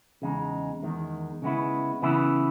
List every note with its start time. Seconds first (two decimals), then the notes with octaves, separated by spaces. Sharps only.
0.22 E2 C#3 G#3 D#4
0.83 E2 D#3 G#3
1.42 C#3 G#3 B3 E4
2.02 C#3 E3 B3 E4